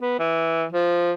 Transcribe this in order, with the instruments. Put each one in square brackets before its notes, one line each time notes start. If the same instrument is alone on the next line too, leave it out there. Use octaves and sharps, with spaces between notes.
[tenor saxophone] B3
E3
F3